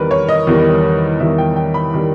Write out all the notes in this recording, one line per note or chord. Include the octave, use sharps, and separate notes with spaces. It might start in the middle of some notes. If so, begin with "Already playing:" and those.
Already playing: E2 D#3 G3 A#4 B4
C#5
D#5
E2 D#3 G3
E2 D#3 G3 E5
G5
G5
B5
D#3 G3